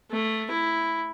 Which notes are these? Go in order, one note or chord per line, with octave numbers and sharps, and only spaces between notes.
A3
E4